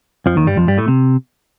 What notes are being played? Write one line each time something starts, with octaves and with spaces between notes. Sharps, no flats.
F2 F3
D#2 D#3
G2 G3
F2 F3
G2 G3
A2 A3
C3